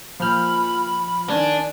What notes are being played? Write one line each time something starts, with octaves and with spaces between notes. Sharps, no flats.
A#2 F3 B5 F6 G6
D#3 D4 G#5 G#6